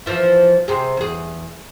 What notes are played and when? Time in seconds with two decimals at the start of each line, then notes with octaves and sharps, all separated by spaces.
0.06 E3 F3
0.68 C3 G#4
0.97 E2 G#4